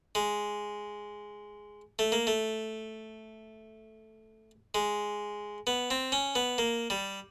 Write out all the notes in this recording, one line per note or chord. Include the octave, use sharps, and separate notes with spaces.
G#3
A3
A#3
A3
G#3
B3
C4
C#4
B3
A#3
G3